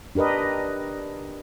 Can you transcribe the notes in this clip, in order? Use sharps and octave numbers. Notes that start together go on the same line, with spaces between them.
D4 G4 A#4 B4 D#5